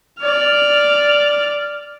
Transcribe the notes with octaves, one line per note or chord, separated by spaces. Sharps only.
D5 F6